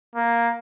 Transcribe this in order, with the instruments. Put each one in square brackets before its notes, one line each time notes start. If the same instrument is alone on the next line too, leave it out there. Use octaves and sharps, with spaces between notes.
[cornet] A#3